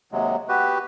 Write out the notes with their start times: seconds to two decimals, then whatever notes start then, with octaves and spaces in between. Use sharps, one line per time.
0.12 D#2 C3 F#3 G#3
0.49 B3 F#4 G4 B4